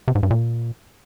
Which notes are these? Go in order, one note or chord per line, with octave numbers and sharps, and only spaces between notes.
C3
G#2
G2
A#2